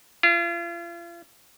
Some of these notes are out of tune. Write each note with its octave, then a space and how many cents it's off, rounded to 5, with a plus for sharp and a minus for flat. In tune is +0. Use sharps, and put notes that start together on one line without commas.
F4 -40